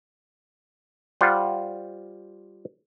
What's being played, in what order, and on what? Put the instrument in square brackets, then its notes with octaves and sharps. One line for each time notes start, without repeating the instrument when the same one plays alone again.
[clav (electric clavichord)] G3 F4 C5 F#5